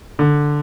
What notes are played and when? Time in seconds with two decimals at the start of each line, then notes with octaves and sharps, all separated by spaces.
0.19 D3